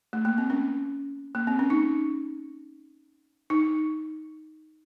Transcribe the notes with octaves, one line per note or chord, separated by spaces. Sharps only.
A3
A#3
C4
C#4
A#3
C4
C#4
D#4
D#4